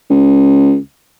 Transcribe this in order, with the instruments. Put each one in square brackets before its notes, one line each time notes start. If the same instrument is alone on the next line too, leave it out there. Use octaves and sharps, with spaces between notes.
[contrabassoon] C#2